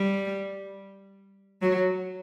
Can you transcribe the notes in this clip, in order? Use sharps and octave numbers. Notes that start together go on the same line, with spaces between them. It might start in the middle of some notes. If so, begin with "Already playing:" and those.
Already playing: G3
F#3